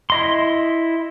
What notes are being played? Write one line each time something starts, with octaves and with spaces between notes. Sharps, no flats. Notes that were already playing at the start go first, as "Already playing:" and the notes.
E4 D#5 C6